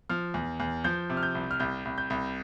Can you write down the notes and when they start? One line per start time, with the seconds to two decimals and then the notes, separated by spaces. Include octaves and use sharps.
0.10 F3 F6
0.34 E2
0.60 E2
0.84 F3 G6
1.10 C3
1.17 F6
1.23 G6
1.35 C2
1.51 F6
1.60 C2 G6
1.85 C2
1.98 G6
2.10 C2